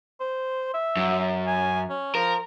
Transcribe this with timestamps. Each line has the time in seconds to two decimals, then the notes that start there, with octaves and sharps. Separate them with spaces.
0.20 C5
0.74 E5
0.96 F#2
1.47 G#5
1.90 C#4
2.15 F3 A#4